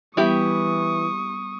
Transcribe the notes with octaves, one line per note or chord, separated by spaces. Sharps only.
E3 G3 B3 E4 G4 C#6 D#6